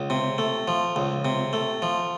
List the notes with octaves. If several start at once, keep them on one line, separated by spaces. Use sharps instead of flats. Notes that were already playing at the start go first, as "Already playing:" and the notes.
Already playing: C#2
C3
A3
F3
C#2
C3
A3
F3